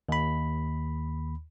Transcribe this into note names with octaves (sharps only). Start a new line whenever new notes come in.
D#2 B5